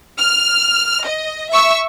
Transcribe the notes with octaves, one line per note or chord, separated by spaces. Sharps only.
F6
D#5
E5 C#6 E6